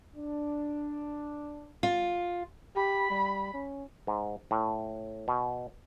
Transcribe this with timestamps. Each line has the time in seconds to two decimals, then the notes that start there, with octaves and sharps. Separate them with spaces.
0.16 D4
1.83 F4
2.76 G4 B5
3.10 G3
3.54 C#4
4.07 G#2
4.51 A2
5.28 B2